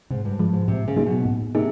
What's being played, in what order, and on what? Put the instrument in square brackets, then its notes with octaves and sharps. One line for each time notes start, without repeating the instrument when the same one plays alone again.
[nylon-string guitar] G#2 [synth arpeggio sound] C3
[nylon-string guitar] G2
[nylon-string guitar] G2 [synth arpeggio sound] F3 G#3
[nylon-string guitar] G#2
[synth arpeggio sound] A2 [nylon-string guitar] C3
[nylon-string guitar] C#3
[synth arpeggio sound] F#3 A#3 D#4 G#4
[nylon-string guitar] B2
[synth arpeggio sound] A2
[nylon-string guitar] C3 [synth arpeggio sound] A#3 D#4 G#4